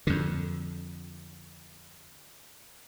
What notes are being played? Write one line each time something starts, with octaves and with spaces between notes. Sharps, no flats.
F2 D3